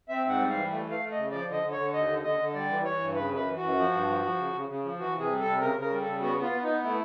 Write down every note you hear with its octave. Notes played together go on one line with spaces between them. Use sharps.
C4 E5
G#2
F#5
G3
F5
E3
A3
A3 F5
A3
C#3 D#5
F3 D5
D3 D#5
D3
C#5
D3
D#2 D#5
D3
D3 D#5
D3
G3 D5
E3
E3 C#5
G2
C#3 B4
F#2 B4
E3
F#2 F#4
F3
G2
F3
F3
C#3
C#3
C#3
F3
E3 F#4
C3 G#4
G3
A4
C3
C#3 A#4
C#3
A#4
G3
A4
C#3
B3 F#4
B3
F4
B3
B3 D#4
A3 E4